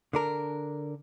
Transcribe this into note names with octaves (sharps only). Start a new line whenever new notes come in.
D3 D4 A#4